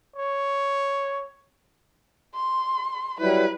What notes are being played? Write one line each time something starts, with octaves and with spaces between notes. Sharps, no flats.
C#5
C6
F#3 G3 E4 B4